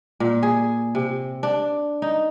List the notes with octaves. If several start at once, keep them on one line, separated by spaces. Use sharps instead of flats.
A#2
G#4
C3
D4
D#4